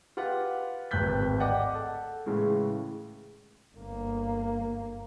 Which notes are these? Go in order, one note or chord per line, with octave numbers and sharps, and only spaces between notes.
F4 G4 B4 F#5
D1 G#1 B4 F#6 G6 B6
D5 D#5 F#5 G5 D6
A4 F#5
A2 C#3 E3 G#3
G1 A#3